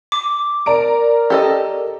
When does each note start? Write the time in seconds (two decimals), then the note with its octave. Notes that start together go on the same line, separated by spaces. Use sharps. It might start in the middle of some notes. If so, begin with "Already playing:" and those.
0.12 D6
0.66 A#4 D5 A#5 D7
1.30 G4 A4 D#5